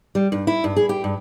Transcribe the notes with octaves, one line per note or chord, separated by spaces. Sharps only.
G3
G2
E4
G2
G#4
G4
G2